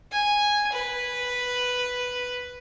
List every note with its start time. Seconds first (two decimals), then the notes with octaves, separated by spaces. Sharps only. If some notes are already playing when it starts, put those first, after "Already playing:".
0.12 G#5
0.72 B4